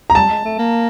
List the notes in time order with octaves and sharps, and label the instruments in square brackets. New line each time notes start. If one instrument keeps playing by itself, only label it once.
[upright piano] A#5
[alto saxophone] G3 [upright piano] A5
[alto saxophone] G#3
A3
A#3